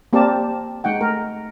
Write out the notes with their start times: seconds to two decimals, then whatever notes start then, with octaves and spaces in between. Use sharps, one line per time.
0.13 A#3 C4 G4 A#4 D5 A5
0.84 G#3 D#4 F#5 G5
1.00 A3 A#4